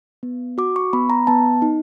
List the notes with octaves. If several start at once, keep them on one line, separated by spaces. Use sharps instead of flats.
B3
F#4 D6
C#6
B3 B5
A#5
B3 A5
D#4